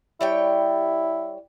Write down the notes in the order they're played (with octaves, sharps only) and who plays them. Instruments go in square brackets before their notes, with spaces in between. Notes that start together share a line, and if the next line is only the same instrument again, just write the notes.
[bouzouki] G3 C#5 G5 [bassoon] E4